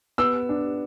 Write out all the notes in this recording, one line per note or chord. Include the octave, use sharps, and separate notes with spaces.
B3 E6
D4